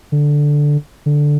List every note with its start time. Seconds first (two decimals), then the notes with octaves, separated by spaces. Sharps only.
0.12 D3
1.06 D3